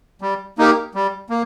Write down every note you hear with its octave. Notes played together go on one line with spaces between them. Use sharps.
G3
A#3 D#4 G4 A#4
G3
A#3